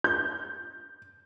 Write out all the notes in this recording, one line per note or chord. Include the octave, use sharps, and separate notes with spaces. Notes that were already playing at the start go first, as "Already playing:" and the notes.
G6